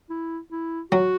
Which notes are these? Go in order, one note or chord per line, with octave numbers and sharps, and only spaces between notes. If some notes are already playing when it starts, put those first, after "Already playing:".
E4
E4
F#3 F#4